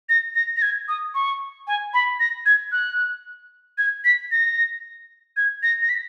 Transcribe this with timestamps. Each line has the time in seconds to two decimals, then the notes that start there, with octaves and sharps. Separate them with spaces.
0.09 A#6
0.35 A#6
0.57 A#6
0.62 G#6
0.88 D#6
1.15 C#6
1.67 G#5
1.94 B5
2.20 A#6
2.46 G#6
2.72 F#6
3.78 G#6
4.05 B6
4.31 A#6
5.37 G#6
5.63 A#6
5.82 A#6
5.89 B6